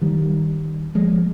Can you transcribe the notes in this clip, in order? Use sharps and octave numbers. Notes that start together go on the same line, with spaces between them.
D#3 G3
F3 G#3